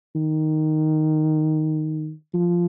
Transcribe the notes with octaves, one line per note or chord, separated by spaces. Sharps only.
D#3
F3